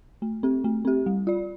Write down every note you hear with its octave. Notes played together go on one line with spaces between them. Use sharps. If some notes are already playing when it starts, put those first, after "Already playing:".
A3
C4 G4
A3
C4 G4
G3
F4 D5